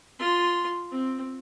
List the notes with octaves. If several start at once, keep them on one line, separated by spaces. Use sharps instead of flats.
F4 C6
C4